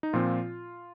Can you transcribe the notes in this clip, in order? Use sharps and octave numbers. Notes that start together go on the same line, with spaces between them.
D#4
A#2 F3 C4 F4